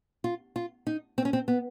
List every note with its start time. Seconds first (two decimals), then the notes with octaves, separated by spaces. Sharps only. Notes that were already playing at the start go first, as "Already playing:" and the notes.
0.24 F4
0.56 F4
0.87 D#4
1.18 C4
1.25 C#4
1.33 C4
1.48 B3